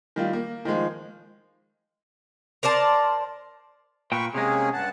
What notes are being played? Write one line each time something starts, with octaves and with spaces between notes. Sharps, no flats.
D#3 G3 F4
A#3
D#3 F3 G#3
A#4 C5 D5 A5
A#2 B4 G5 C#6
C3 G#3 A#3 C#4 G#4
G2 F#5 A5